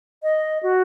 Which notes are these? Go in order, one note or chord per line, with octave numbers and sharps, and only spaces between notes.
D#5
F#4